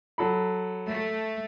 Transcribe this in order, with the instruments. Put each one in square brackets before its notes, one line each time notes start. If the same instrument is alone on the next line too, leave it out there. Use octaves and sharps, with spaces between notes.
[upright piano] F#3 A4 B5
[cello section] A3